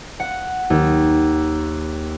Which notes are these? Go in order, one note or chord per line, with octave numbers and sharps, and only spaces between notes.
F#5
D#2